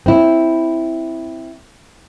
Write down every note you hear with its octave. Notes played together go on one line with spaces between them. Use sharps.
C4 E4